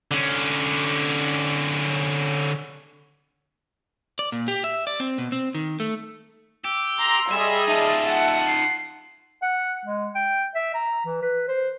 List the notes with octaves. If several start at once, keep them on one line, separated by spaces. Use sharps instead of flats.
D3 C#4
D5
A#2
G4
E5
D5
C4
B2
C4
D#3
A3
G4 E6
A#5 C6
G3 G#4 D#5 E5 C6
D#4 F4 E5 A5
F#5
C7
F#5
G#3
G5
E5
A#5
E3
B4
C5